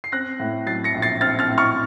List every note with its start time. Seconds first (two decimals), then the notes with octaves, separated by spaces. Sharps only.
0.04 C7
0.12 C4 F#6 A#6
0.40 A2
0.66 F#3 A6 C7
0.84 A#6 C#7
0.94 A#1
1.02 A6 C7
1.21 C4 F6 A6
1.39 F6 A6
1.49 A2
1.58 C#6 F6